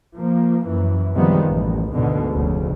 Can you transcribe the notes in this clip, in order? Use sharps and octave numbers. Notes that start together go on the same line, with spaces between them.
F3 A#3
F#2 E3
C3 D#3 F3 G3 G#3 B3
A1 D#2
D2 G#2 B2 D3
F1 D2 C#3